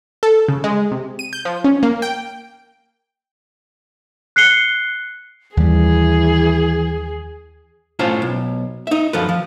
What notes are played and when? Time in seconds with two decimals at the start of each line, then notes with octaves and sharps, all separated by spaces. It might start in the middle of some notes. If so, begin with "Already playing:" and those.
0.23 A4
0.49 C#3
0.64 G#3
0.92 C3
1.19 D#7
1.33 G6
1.45 F3
1.64 C#4
1.83 A#3
2.02 G5
4.36 F#6 C7 C#7 G7
5.57 D#2 E3 G3 G#4
7.99 A2 C#4 F4 C5 F5 A5
8.22 B1
8.87 D#4 E5
9.13 F#2 F3 A4 B4
9.29 F3